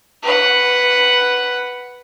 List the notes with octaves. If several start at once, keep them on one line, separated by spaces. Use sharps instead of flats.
B4 F#5